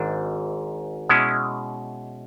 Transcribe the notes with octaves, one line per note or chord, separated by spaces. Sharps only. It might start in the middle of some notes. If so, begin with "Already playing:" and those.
Already playing: G#1 G#2 D4
B2 G#3 C#4 E4